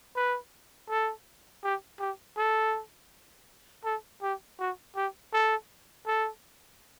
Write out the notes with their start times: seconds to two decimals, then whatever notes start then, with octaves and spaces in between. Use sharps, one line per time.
0.16 B4
0.89 A4
1.64 G4
2.00 G4
2.37 A4
3.85 A4
4.22 G4
4.60 F#4
4.96 G4
5.33 A4
6.06 A4